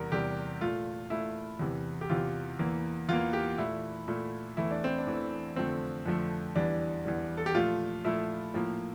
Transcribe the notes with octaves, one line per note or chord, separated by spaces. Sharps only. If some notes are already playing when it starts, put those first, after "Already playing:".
Already playing: E2 C3 G3 A#4
E2 C3 G3 G4
A#2 A3 F4
A#2 A3 E4
E2 C3 E3
G4
E2 C3 E3 F4
E2 E3 A#3
E2 E3 A#3 F4
G4
A#2 A3 E4
A#2 A3
E2 E3 A3 E4
D4
C4
D4
E2 E3 A3
F2 D3 F3 A3 C4
F2 D3 F3 A3
E2 E3 G3 D4
E2 E3 G3
A4
G4
A#2 F3 A3 F4
A#2 F3 A3 E4
A2 F3 A#3